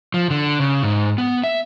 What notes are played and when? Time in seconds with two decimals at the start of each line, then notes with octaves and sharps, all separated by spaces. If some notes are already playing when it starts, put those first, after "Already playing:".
0.14 F3
0.30 D3
0.60 C#3
0.83 G#2
1.18 B3
1.44 E5